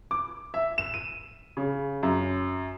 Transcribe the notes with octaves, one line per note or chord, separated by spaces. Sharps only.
D6
E5
E7
D#7
C#3
F#2